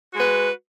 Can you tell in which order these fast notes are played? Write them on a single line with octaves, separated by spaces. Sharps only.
F#4 G#3 B4